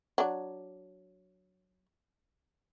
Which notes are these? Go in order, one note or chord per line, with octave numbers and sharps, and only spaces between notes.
F#3 D4